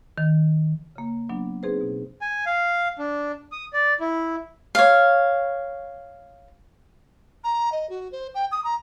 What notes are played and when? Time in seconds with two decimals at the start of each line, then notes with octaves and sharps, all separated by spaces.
0.18 D#3
0.96 C#3 A#3
1.29 F#3 B3 D4
1.63 C4 D#4 G#4 B4 C5
1.81 B2
2.21 G#5
2.46 F5
2.99 D4
3.52 D#6
3.73 D5
4.00 E4
4.75 C#5 F5
7.44 A#5
7.72 D#5
7.89 F#4
8.12 C5
8.35 G5
8.52 D#6
8.64 A#5